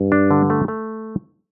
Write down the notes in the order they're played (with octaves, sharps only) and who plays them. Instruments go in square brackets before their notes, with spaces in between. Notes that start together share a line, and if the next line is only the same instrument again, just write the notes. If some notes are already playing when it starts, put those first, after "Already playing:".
Already playing: [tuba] G2
[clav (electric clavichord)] D4
D3
A3
A3